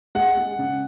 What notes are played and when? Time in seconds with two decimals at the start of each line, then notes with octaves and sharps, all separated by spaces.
0.15 G#3 F#5
0.37 G#3
0.59 C#3